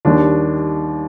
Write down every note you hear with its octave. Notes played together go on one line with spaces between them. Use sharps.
D#2 D#3 G3 D4